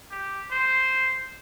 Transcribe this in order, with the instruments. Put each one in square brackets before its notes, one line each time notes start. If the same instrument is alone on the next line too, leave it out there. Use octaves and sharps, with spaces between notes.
[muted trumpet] G4
C5